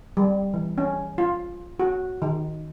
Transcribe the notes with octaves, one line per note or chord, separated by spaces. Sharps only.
G3
E3
C#4
F4
F#4
D#3